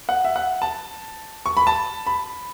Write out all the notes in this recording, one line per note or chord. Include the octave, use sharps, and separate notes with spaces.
F#5
E5
F#5
A5
C#6
B5
A5
B5